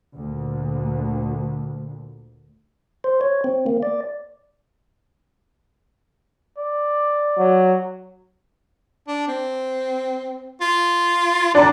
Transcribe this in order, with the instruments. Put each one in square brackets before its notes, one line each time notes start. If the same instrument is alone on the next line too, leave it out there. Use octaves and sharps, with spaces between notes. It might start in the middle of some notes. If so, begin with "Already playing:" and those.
[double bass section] D2 A#2
[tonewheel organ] C5
C#5
C4
A#3
D5
[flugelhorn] D5
[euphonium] F#3
[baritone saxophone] D4
C4
F4
[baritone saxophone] A2 [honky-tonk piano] D4 A#5